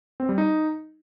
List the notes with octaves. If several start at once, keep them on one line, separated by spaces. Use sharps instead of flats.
C4
G3
D#4